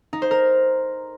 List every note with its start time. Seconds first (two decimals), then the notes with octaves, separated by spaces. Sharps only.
0.13 D#4
0.22 C5
0.31 A#4